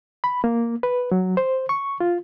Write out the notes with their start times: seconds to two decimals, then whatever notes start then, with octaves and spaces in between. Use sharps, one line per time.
0.24 B5
0.44 A#3
0.83 B4
1.11 F#3
1.37 C5
1.69 C#6
2.00 F4